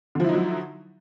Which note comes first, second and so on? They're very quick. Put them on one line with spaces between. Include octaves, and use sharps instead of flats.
D3 F3 E4 D#4 F#3